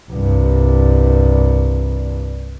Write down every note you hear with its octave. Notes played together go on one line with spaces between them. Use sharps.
C2 G2